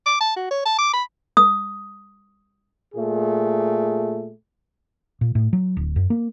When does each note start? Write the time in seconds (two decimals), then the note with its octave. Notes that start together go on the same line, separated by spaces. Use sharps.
0.06 D6
0.21 A5
0.36 F#4
0.51 C#5
0.65 A5
0.79 D6
0.93 B5
1.37 D#6
2.95 A#2 A3 G#4
5.21 A#2
5.35 A2
5.53 F#3
5.77 D1
5.96 F#2
6.10 A#3